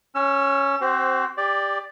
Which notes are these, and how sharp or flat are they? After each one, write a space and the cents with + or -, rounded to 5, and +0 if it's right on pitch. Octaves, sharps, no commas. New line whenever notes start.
C#4 +0 E6 +40
C4 +10 F#4 +40 C5 +0
G4 +20 D5 +0